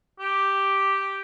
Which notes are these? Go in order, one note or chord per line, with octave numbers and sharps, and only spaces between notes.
G4